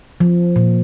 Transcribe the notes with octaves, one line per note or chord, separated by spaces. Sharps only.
F3
A#2